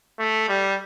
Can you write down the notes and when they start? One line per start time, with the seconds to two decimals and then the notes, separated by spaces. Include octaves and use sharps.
0.19 A3
0.48 G3